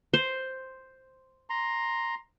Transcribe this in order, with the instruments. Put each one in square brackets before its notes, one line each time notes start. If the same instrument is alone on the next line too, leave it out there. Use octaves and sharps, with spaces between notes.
[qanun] C5
[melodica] A#5 C6